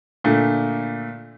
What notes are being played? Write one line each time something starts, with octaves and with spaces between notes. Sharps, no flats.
A#2 D3 A3